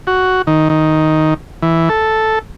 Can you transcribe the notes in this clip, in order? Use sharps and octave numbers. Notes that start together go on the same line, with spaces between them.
F#4
D#3
D#3
E3
A4